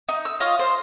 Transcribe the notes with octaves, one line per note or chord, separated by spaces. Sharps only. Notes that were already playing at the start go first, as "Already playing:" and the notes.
D#4
E6
F4 C#5 D#5 F5
C5